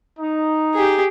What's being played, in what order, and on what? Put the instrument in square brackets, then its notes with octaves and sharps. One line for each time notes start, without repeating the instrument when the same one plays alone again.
[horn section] D#4
[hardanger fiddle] G4 G#4